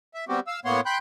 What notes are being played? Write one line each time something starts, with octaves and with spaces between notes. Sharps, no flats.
E5
G3 B3 C4 F#4 G4
F5 E6
A2 A#3 B3 C#5 F#5 C6
G5 B5 C6 F#6 G6